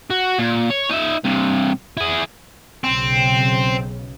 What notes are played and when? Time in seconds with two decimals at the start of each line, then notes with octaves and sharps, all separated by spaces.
0.10 F#4
0.39 A#2
0.70 C#5
0.89 D#4 E5
1.24 G2 C3
1.97 E4 G#4
2.84 B1 C#3 C4